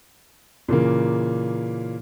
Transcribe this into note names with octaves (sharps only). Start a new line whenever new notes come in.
A#2 C#3 E3 A#3